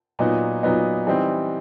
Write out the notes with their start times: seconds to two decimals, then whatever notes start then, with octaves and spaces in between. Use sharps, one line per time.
0.19 A#2 F#3 B3 D#4
0.63 A#2 F#3 B3 D#4
1.07 E3 G3 C4 D#4